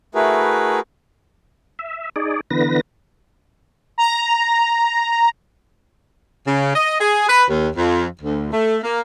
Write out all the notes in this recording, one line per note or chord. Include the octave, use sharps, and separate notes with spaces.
A3 E4 F#4 G#4 A#4 B4
E5
D#4 G#4 D5
D3 E3 B3 B4 A#6
A#5
C#3
D#5
G#4
B4
D#2
F2
D2
A3
A#3